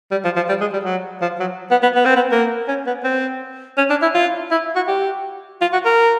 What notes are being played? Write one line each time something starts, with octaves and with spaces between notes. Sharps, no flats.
G3
F3
F3
G3
G#3
G3
F#3
F3
F#3
B3
B3
B3
C4
B3
A#3
C#4
B3
C4
C#4
D4
E4
F4
E4
F#4
G4
F4
F#4
A#4